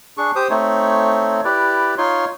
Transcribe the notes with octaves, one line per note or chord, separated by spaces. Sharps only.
D4 G#4 C#6
G4 C5 D#6
A3 C4 D#4 C#5
E4 G4 B4 D5
D#4 F4 C#5 C6